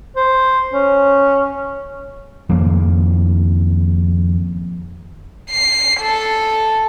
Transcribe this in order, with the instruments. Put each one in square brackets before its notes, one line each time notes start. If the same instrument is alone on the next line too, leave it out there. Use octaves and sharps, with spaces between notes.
[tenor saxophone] C5
C#4
[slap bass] F2 D#3 F3 A#3
[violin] C7
A4